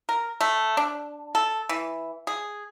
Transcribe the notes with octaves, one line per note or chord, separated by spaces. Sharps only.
A#4
A3
D4
A4
E3
G#4